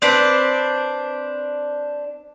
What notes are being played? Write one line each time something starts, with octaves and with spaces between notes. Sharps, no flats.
C4 D4 B4